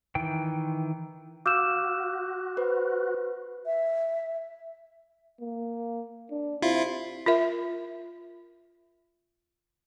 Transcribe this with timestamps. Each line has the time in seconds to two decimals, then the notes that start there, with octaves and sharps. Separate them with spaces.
0.15 D#3 E3 G5
1.46 F#4 F5 D6 E6 F6 G6 E7
2.57 B4 C5
3.66 E5
5.40 A#3
6.30 D4
6.63 C3 E4 F4
7.26 F4 A#4 E5